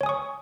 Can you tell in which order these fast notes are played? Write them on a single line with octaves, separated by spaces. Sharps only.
C#5 G#5 D#6 C#6